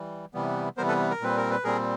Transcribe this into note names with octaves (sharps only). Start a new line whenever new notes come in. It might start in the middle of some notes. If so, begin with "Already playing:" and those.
Already playing: E3 G3
C3 E3 G3 B3
C3 E3 G3 B3 A#4 C5
A4 B4
A#4
A#2 G3 C4 B4
A#4
B4
A#2 G3 C4 G#4 A#4